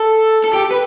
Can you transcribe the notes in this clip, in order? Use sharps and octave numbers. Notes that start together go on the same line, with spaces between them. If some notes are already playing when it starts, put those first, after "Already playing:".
Already playing: A4
A4
G4
B4